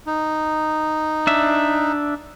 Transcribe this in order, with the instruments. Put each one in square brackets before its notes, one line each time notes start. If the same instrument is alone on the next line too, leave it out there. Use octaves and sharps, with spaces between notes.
[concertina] D#4
[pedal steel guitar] D4 E5